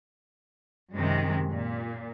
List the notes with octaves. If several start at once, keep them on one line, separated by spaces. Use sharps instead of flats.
F#2 C3 D#3 G#3
A#2